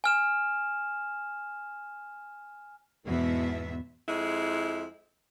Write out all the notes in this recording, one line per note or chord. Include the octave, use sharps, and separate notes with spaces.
G#5 F6 E7
E2 G#2 B2 B3 E5
F2 G#3 E4